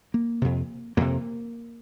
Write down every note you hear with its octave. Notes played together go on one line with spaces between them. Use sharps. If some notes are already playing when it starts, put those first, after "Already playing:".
A#3
F2 C3
F2 C3 A#3